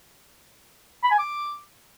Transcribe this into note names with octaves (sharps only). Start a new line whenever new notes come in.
B5
G#5
D6